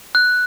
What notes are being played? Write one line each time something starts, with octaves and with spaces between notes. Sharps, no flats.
F#6